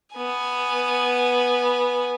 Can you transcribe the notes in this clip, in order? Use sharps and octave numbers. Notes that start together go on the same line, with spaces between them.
B3 G#5